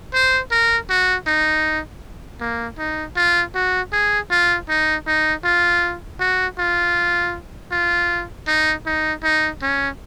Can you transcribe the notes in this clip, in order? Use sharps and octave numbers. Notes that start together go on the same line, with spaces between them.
C5
A#4
F#4
D#4
A#3
D#4
F4
F#4
G#4
F4
D#4
D#4
F4
F#4
F4
F4
D#4
D#4
D#4
C#4